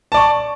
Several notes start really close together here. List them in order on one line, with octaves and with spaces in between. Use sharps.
A5 D5 C#6